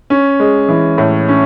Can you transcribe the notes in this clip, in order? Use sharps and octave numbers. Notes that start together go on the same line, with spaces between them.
C#4
G#3
E3
A2
C#4